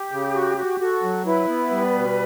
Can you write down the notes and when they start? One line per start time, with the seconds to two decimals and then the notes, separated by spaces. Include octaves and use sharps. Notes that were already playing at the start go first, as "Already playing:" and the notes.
Already playing: G4
0.12 C#3
0.35 F#4
0.58 F#4
0.80 F#4 A4
1.03 F#3
1.25 E4 B4
1.48 B3
1.71 G3
1.95 B2